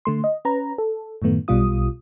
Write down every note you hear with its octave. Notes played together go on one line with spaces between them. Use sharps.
D3 A3 C6
D#5
C#4 B4 A#5
A4
F#2 A2 D#3 A3 B3
B1 B2 G3 F4 D#6